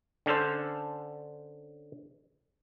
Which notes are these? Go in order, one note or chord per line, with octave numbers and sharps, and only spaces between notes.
D3 C#4 D4 A4 C5